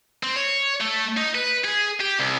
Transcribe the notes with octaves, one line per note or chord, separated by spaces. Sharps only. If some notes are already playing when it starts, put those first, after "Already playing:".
C4
C#5
A3
D#4
B4
G#4
G4
C2